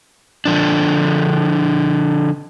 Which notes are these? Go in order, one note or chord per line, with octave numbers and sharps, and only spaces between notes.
D3 F3 D4